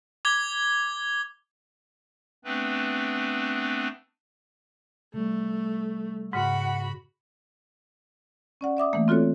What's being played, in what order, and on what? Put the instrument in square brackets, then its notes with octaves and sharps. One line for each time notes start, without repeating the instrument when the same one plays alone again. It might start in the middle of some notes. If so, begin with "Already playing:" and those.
[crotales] D6 G#6 G7
[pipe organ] A3 B3 C4 D4 B4
[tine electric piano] C3 G3 [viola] A3
[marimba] G#2 C#3 [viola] F#4 B5 [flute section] F#5
[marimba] C#4 D5 F#5
D5 E5 D6 D#6
E3 A3 A#3
C4 F4 F#4 A4 C#5